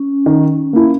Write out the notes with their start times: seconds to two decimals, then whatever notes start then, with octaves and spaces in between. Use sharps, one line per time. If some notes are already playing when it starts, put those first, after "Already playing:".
Already playing: C#4
0.26 D#3
0.73 A#3 E4